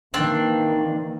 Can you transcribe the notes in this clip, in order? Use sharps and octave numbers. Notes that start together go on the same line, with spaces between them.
D#3 E3 A#3 C4 D4 G5